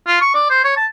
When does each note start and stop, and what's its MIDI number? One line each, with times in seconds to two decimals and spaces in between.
0.07 0.17 65
0.22 0.32 85
0.35 0.50 74
0.50 0.63 72
0.65 0.75 73
0.77 0.86 81